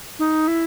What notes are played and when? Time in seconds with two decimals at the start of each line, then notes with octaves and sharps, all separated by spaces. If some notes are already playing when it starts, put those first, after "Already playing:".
0.19 D#4
0.48 E4